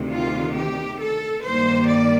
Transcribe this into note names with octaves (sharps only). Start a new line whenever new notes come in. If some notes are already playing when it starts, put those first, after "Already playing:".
Already playing: D2 C3 D#3
F4
G4
A4
G2 D#3 G3 A#3 C5
D5